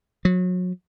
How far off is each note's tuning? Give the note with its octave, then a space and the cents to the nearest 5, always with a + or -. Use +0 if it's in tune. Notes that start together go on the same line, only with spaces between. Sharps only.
F#3 -30